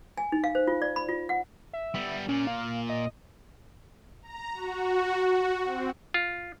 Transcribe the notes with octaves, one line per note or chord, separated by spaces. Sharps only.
G#5
D#4
F5
C5
F4
D5
B5
F4
F#5
E5
G3 B3
A#2 C#4
F5
D#5
A#5
F#4
F#4
C4
F4